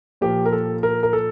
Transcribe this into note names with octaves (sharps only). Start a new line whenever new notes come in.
A#2 F3 G4
A#4
A4
A#4
A#4
A4